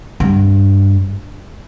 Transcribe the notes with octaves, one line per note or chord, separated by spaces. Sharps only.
G2